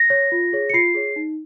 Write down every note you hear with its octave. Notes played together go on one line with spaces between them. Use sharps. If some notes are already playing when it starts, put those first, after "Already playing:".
Already playing: A#6
C#5
F4
G#4 C#5
C#7
F4 C7
G#4 C#5
D#4